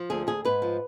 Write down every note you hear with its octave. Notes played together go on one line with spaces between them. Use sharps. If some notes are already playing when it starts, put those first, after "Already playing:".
Already playing: F3
D2 G#4
D2 G#4
G#2 B4
F3